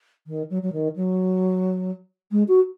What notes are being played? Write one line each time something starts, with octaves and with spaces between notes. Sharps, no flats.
D#3
F#3
F#3
D#3
F#3
G#3
F#4